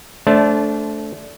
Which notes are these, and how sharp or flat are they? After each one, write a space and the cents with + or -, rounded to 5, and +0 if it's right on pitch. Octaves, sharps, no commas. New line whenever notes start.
A3 -10 D4 -25 C5 +0